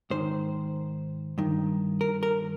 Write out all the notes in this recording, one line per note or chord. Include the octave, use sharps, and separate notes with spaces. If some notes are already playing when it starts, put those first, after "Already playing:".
G#2 D#3 C5
G2 D#3
A#4
A#4